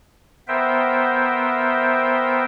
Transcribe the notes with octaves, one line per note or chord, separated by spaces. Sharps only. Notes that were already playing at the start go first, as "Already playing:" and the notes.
B3 A#4 C5 E5 G5